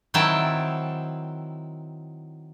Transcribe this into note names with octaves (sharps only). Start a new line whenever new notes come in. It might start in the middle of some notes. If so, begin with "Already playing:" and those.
D#3 F#3 C4 E4 G5 A5